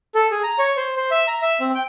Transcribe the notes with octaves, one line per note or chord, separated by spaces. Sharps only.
A4
G#4
A#5
C#5
C5
C5
E5
A#5
E5
C4
G5